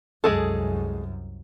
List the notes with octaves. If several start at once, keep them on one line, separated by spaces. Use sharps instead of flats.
C2 F#2 G#3 G#4 A4